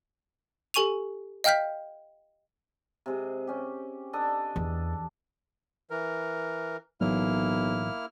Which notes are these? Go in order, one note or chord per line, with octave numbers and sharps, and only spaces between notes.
G4 A4 G#5 C#6 D#7 F7
D#5 F5 G5 F6 G6 B6
C3 G#3
C#4 G4
D4 A4 D#5
E2
E3 A#4
B1 A2 E3 F#3 A#3 E4 F6